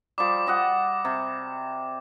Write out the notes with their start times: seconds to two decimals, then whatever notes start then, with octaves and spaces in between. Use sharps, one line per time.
0.18 F3 G3 D6
0.47 G3 D#5 F#5
1.05 C3